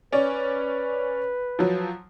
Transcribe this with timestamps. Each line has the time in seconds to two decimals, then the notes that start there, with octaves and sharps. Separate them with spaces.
0.13 C#4 B4 D5
1.59 F3 F#3